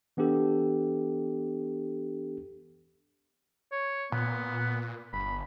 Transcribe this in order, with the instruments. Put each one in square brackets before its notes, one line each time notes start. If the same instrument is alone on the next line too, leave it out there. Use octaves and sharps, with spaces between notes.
[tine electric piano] E3 B3 D4 G4 A4
[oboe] C#5
[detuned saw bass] A#2 [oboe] B3
[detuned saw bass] G1 [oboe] B5